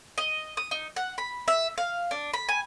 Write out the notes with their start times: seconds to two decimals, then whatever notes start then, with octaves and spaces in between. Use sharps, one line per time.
0.18 D#5
0.57 D#6
0.71 D#4
0.96 F#5
1.18 B5
1.48 E5
1.78 F5
2.11 D4
2.34 B5
2.49 G#5